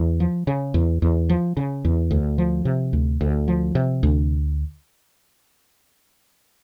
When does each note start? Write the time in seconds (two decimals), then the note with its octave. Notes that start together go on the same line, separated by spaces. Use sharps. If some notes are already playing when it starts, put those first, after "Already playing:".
Already playing: E2
0.20 F3
0.47 C#3
0.74 E2
1.02 E2
1.29 F3
1.57 C#3
1.85 E2
2.11 D2
2.38 F3
2.65 C3
2.93 D2
3.21 D2
3.48 F3
3.75 C3
4.03 D2